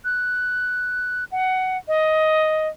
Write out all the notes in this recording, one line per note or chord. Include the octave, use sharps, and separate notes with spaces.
F#6
F#5
D#5